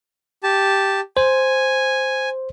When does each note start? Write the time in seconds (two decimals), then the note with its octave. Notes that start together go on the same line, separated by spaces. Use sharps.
0.43 G4 A5
1.17 C5 G#5